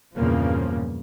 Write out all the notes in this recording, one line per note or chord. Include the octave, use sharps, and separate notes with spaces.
E2 G2 A#2 C#3 F3 A#3